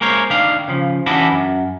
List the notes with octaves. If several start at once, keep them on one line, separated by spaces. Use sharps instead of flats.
G#3 A#3 A#4 C5 C#5
D#3 D4 F5
C#3 F3
E3 C#4 D4 E4 F#4 B4
F#2